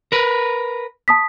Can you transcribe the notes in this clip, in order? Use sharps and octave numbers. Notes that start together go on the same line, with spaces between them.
A#4 B4
A5 D#6 B6